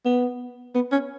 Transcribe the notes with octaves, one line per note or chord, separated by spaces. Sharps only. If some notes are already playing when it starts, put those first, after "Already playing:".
B3
B3
C#4